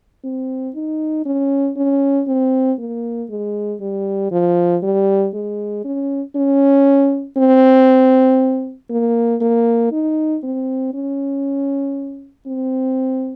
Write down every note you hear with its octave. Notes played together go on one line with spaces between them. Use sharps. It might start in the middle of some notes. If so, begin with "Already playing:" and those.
C4
D#4
C#4
C#4
C4
A#3
G#3
G3
F3
G3
G#3
C#4
C#4
C4
A#3
A#3
D#4
C4
C#4
C4